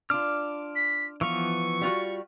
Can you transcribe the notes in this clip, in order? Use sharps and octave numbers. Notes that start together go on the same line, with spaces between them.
D4 F4 D6 F6
B6
E3 F3 B3 F5 C#6
G3 F4 F#4